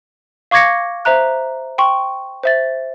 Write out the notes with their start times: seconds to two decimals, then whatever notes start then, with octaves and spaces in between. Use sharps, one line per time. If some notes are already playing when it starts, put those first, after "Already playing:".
0.51 F5 C#6 D6 G#6 A#6 C#7
1.05 C5 E5 A#5 F#6
1.78 G5 C6 C#6
2.43 C5 E5 A6